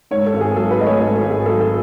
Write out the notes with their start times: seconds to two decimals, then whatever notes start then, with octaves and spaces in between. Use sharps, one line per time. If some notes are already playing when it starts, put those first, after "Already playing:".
0.11 G#2 C#5
0.26 A4
0.34 G#1
0.41 G#4
0.56 F#3 A4
0.71 B4
0.79 A3 D#5
0.86 C#5
1.01 G#2 A4
1.16 A4
1.23 G#1
1.31 G#4
1.46 F#3 A4
1.60 A4